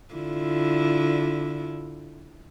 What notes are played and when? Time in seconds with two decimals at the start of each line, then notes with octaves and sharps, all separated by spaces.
0.14 D3 E4 F4